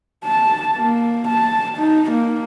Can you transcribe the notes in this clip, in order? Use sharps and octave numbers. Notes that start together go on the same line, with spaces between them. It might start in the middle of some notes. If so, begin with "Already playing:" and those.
A5
A#3
A5
D#4
A#3